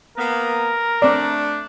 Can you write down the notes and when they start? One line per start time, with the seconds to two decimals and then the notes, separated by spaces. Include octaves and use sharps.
0.18 A#3 B3 A#4
1.02 A3 C4 D4 D5